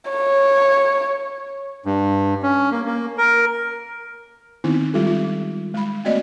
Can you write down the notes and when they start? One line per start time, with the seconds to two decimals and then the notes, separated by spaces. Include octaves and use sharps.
0.11 C#5
1.86 G2
2.43 C#4
2.71 A#3
2.85 A#3
3.18 A#4
4.64 D#3 B3 C4 D#4 E4
4.94 G3 G#3 F4 G4 A4
5.07 F4
5.74 G#3 B5
6.04 A3 A#3 C4 F#4 D5 D#5